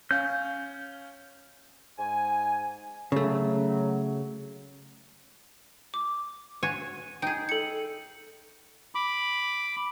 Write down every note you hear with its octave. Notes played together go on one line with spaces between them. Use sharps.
C#4 F5 G6
G#2 G#5
C#3 F#3 A3
D6
F#4 C#5 G#5
D#4 G#4 G5 G6
A4 C#7
B5 D6